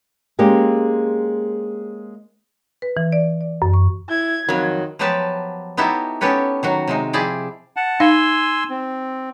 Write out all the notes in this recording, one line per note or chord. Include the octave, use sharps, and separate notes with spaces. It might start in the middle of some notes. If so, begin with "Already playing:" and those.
G#3 A#3 C4 C#4 G4
B4
E3
D5
D5
F#2
C#6
E4 G#6
F2 D#3 F#3
F3 F#3 B3 G4 B4 A5
B3 D#4 E4 F#4 G4 A4
B3 C#4 G4 A4 B4 C#5
D#3 F#3 F#4
C3 G#3 D#4
F3 E4 G4 G#4 D5
F#5 A5
D#4 F5 G#5 C6 E6
C4